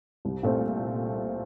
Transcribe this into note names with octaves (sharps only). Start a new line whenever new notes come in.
C2
A#2 A3 C4